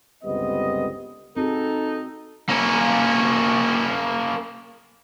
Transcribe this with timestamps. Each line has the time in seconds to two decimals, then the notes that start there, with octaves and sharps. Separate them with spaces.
0.24 G1 C#2 G3 B3 C4 D#5
1.37 C4 D#4 F#4 G#4 A4
2.49 A#3 C#4